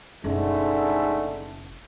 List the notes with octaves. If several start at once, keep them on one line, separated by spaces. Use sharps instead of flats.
F#1 G#2 B2 D3 A3